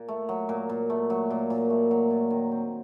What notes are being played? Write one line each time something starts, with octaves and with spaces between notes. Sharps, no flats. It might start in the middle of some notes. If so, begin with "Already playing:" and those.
Already playing: A#2
A3
F#3
A#2
A#2
A3
F#3
A#2
A#2
A3
F#3
A#2
D#3
C4